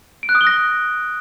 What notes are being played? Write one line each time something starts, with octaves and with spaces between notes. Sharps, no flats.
D7
F#6
D#6
G7
A#6